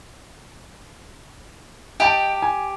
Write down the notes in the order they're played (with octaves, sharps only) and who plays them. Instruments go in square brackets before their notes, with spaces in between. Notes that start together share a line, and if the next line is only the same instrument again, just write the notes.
[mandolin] G4 [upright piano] D#5 G5 A5
[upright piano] G#5